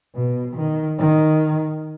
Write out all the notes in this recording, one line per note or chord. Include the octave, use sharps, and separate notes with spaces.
B2
D#3
D#3